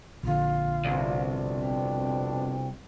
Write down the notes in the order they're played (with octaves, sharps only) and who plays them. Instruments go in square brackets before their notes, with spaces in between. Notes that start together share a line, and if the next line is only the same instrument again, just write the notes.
[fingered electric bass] A#1 D3 [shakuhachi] F4
[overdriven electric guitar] C2 [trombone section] F2 B2 D4
[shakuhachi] G5